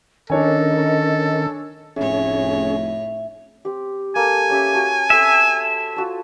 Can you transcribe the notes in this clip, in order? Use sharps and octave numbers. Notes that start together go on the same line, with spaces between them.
D#3 C#4 D4 A4 A#4 C#5 D#5 G#5
F1 A2 C#4 G#4 C#5 E5
C4 G4
A#3 A4 G#5
C#4 G4 E5
F#4 A5 D#6
C4 A4 E5
F4 F#4 A4